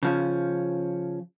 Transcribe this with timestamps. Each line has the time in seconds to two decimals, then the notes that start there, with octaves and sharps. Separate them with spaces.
0.03 C#3 F3 C#4